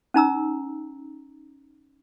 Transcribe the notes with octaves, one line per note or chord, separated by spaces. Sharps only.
C#4 D#4 A#5 E6